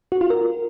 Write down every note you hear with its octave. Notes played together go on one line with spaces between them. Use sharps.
F#4
F4
A#4